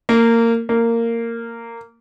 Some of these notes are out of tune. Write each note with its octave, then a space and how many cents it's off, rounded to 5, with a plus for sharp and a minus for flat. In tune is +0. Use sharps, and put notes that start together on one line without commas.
A#3 -20
A#3 -15